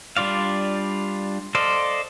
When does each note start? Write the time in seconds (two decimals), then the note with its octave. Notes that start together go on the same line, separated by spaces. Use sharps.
0.17 G3 D4 F4 D5 F5
1.55 A4 C5 D5 D#5 F5